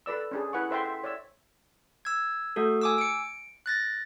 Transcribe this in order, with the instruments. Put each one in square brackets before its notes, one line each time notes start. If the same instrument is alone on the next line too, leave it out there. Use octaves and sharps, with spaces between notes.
[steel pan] A4 B4 D5 E6
C#4 D4 G#4
E4 B4 F#5 G#5 C#6
A4 C5 E5 G5 C6
E5
C#5 D5 E5 E6
[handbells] E6 G#6
A3 F#4 A4
G#5 D6 E6
C#7 D7
F#6 A6 A#6